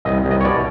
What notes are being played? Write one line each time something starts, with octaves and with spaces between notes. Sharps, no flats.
C2 D#5
C2
D#5
C#5
B2 D5